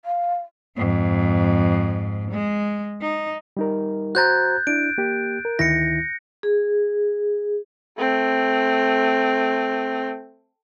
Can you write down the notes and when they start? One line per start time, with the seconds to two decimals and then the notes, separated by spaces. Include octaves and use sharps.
0.05 F5
0.77 F2 G#2
2.31 G#3
3.01 D#4
3.57 G3 D#4 A#4
4.15 F#4 C5 A#5 F#6 G6 A6
4.67 D4 E4 D7
4.98 A#3 G4
5.45 A#4
5.59 D2 D#3 E4 A#6 C#7
6.43 G#4
7.99 A3 C4